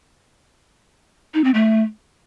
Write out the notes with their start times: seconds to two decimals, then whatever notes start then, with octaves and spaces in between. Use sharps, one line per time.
1.34 D#4
1.44 C4
1.54 A3